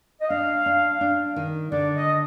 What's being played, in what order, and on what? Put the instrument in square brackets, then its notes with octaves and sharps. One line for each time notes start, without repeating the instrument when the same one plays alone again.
[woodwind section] D#5
[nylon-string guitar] D4 [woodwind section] F5
[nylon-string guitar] D4
D4
D#3
[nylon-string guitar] D3 [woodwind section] D5
[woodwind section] D#5